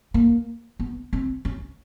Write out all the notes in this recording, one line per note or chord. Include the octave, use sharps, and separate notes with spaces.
A#3
B3
C4
C#4